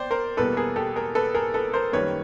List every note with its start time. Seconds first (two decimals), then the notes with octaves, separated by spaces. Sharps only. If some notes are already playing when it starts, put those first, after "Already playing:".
Already playing: C5 D5 G5
0.11 A#4 C5
0.37 E2 B2 G3 A#3 A4 B4
0.57 G#4 A#4
0.76 G4 A4
0.96 G#4 A#4
1.15 A4 B4
1.34 G#4 A#4
1.54 A4 B4
1.74 A#4 C5
1.93 F#2 D#3 G3 A#3 B4 C#5